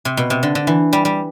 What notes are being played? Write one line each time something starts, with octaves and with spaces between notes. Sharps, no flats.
C3
B2
C3
D3
D3
E3
G3
G3